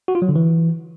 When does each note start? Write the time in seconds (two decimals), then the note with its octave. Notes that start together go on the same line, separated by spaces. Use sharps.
0.08 F#4
0.15 F4
0.22 F#3
0.29 D3
0.36 E3